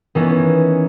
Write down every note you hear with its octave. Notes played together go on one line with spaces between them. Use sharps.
D#3 E3 B3 C#4 D#4